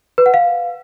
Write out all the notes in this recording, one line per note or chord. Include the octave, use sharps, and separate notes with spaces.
B4
F#5
F5